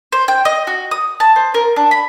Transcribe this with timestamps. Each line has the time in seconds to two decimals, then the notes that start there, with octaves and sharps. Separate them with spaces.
0.12 C5
0.28 G5
0.45 D#5
0.67 F#4
0.91 D#6
1.20 A5
1.36 C5
1.54 A#4
1.76 D4
1.91 B5